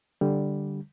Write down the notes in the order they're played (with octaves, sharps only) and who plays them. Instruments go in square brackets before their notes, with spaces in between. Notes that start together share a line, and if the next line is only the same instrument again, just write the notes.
[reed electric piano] D3 G3